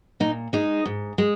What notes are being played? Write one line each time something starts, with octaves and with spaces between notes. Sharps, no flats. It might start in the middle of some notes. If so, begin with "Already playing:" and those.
A#2 D#4
G#3 D#4
G#2
G#3